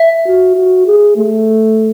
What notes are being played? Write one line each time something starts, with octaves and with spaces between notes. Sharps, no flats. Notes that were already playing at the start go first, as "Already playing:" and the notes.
Already playing: E5
F#4
F#4
G#4
A3